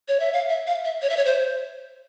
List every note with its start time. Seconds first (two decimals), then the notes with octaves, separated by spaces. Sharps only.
0.08 C#5
0.20 E5
0.33 F5
0.49 E5
0.67 F5
0.85 E5
1.02 C#5
1.10 E5
1.17 C#5
1.25 C5